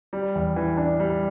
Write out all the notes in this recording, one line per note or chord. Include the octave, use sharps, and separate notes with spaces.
G3
E2
E3
D4
G3